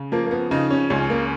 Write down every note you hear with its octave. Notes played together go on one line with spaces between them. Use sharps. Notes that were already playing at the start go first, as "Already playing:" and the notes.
Already playing: C#3
F3 A#3
A#3
B3
C#3 D#4
C#4
C#2 C#4
A#3